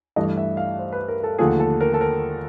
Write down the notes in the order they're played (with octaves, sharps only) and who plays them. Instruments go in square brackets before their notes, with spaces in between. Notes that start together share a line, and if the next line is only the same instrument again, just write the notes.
[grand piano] G2 E3 A3 D#5
E5
F5
C5
B4
A#4
A4
D#2 D3 F3 A3 G#4
A4
A#4
A4
A#4